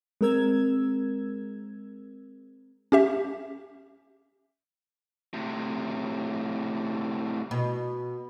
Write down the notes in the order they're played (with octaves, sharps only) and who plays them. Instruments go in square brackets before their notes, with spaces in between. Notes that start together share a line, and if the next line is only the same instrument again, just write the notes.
[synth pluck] G#3 C4 A#4 E6 G#6
[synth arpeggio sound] C#4 G4 E5
[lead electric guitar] A2 C3
[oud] B2